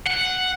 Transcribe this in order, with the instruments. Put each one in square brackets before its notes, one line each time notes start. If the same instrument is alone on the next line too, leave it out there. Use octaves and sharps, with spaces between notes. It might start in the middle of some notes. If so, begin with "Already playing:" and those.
[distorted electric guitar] F#5